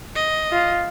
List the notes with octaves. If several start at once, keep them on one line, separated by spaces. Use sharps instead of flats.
D#5
F4